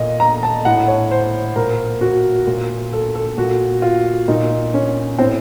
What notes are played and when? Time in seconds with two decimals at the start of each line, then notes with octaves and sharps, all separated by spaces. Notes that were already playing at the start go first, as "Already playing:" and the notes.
Already playing: A#2 D#5
0.20 A#5
0.43 A5
0.65 A2 F#5
0.88 C#5
1.11 C5
1.56 A#2 A#4
2.01 F#4
2.47 A#2
2.93 A4
3.15 A4
3.38 A#2 F#4
3.82 F4
4.28 A#2 D#4
4.74 C#4
5.19 A2 C4